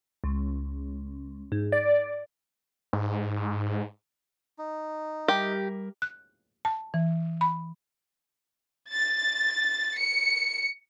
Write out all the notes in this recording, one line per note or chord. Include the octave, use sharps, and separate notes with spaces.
C#2
G#2
D5
G#2
D#4
G3 G4 A#4 E5
F#6
A5
E3
B5
A6
C#7